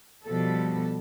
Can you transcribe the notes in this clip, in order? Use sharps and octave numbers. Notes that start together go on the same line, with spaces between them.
B2 F3 G3 A4